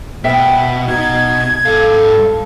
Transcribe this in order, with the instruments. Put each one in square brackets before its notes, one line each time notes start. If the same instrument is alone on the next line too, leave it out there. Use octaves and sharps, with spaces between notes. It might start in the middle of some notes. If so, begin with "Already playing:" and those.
[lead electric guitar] B2 [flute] B4 [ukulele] E5 G5
[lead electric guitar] B2 [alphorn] D#4 [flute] G#6
[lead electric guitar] G#2 F5 [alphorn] A4